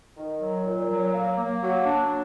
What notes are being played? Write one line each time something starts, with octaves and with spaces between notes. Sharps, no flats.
D#3
F#3
A#2
F#3
A#3
A#3
F#3
D4